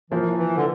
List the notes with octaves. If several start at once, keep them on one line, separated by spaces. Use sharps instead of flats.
E3 F3 A#3 F4 C5
E3
D3